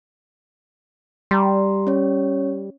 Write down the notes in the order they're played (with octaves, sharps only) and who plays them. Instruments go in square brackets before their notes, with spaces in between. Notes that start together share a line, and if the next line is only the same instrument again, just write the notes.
[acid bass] G3 [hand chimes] A#5 C6
[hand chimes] C#4 C#5